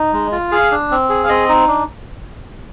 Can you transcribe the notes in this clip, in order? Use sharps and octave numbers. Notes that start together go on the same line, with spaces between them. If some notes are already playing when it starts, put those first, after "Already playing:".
Already playing: D#4
G#3
F4
G#4 F5
D4
C4
G#4
F5
C4 D#5
D#4
D4